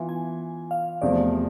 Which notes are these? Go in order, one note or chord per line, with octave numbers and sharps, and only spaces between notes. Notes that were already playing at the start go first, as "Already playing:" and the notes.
Already playing: E3 B3 F4
G#5
F5
E2 C3 F3 A3 D5